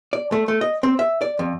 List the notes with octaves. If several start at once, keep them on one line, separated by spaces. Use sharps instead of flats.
D5
A3
A3
D#5
C4
E5
D5
F2